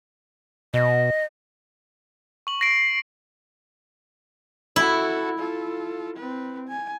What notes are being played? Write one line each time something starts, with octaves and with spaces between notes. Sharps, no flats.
B2 D#5
C#6 F#7
A#6 C7 D7
E4 F#4 A4
F4 A4
C4 B4
G#5